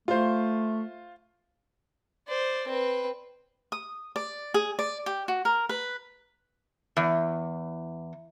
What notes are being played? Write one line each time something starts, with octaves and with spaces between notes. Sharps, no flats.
A3 F4 C5
C5 D5
C4 B4
D#6
D5
G#4
D5
G4
F#4
A#4
B4
E2